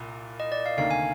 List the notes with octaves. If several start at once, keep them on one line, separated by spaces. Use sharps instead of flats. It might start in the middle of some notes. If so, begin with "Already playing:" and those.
Already playing: C2 A#2
D#5
D5
F5
D2 C3 D#3 A#3 F5
G#5